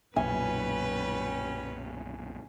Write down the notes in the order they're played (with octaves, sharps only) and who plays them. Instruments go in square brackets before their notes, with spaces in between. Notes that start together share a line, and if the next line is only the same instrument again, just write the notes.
[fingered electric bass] B1 F#2 A#2 [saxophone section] G3 C#4 [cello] B4 [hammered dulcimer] G#5